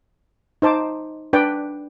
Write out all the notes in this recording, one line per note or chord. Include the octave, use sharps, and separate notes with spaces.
D#4 C5 A5 D6
D4 B4 D5 G5